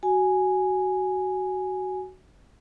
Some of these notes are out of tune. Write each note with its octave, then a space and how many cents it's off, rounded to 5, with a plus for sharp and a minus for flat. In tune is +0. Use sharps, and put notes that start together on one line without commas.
F#4 +15 G#5 +0